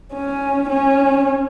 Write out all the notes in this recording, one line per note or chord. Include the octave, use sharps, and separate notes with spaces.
C#4
C#4